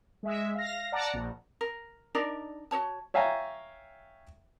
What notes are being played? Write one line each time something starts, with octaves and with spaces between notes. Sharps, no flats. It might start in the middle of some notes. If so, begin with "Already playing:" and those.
G#3 E5
F5 A#6
D5 F#5 A5 A#5
A#1
A#4
D4 D#4 A#4 D5
F#4 A4 C#5 A5
C#5 E5 F5 G5 G#5 A#5